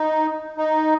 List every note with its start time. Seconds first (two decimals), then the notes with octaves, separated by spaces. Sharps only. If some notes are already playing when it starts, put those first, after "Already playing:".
Already playing: D#4
0.58 D#4